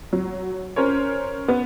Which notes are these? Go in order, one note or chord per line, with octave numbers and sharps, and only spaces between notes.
F#3
C#4 A#4 C5 C#5
B3